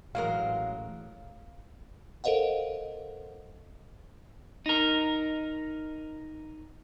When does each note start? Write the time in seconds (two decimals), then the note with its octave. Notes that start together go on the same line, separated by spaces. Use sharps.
0.15 A1 F#3 G#3 A#4 F5
2.24 A4 A#4 C5 D#5 F5 F#5
4.66 D#4 A#4